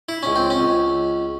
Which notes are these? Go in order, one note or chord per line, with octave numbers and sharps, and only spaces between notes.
E4
C#2 C#4
C4
C#4
C#2